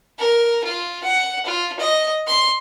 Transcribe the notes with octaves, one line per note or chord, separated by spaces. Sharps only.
A#4
F4
F#5
F4
D#5
C6